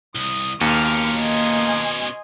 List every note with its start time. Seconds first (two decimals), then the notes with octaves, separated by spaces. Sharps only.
0.15 C2 D#6
0.61 D#2 B2 A#3 C#4 C6 D6 F6
1.22 D#5 G#5 C6